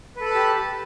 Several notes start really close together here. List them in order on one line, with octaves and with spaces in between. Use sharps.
B4 A4 B5 A5 G4